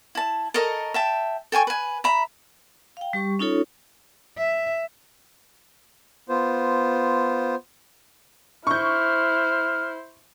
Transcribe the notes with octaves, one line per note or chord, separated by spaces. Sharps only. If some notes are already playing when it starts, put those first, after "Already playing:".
E4 A5
A4 A#4 C#5 D#5
E5 G5 A5
A4 G5 G#5 C#6
B4 G#5
E5 A#5 B5
F5 G5
G3 G4 C#6
C#4 D#4 F4 A4 C#5
E5
B3 F4 C5
E4 C5 C#6 F6 G6